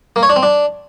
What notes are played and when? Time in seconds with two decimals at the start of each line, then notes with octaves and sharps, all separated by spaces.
0.16 A#3
0.23 C#5
0.29 D4
0.36 C4
0.43 D4